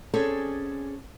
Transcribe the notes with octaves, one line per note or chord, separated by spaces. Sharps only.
C4 C#4 G#4 A4 D5